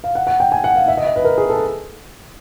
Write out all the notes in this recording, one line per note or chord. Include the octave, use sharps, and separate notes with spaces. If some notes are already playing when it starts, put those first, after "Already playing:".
F5
F#5
F#5
G5
G#5
F#5
F5
E5
D#5
E5
B4
A#4
G#4
A4